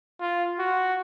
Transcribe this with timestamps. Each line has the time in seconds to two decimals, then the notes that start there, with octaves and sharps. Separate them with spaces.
0.21 F4
0.59 F#4